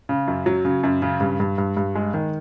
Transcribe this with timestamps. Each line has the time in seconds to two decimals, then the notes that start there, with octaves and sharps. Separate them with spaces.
0.09 C#3
0.28 F#2
0.46 F#3
0.65 C#3
0.83 F#2
1.02 C#3
1.20 G2
1.40 G2
1.58 G2
1.77 G2
1.95 G#3
2.14 D#3